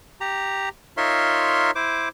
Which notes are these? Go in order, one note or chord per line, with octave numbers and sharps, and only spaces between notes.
G4 A#5
D#4 F4 A#4 C#5 E5 C6
E4 C5 D6